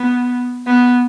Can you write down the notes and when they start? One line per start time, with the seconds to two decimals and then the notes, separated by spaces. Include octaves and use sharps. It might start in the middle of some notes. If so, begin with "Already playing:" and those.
Already playing: B3
0.67 B3